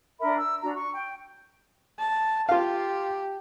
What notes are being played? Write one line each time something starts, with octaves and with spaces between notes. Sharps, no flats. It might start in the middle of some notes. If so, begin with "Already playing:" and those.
D4 A#4 E5 B5
E6
D4 F#4 A#5
C#6
G5
A5
F4 G4 F5